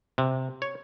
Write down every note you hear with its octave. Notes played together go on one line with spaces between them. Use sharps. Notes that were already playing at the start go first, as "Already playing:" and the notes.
C3
C#5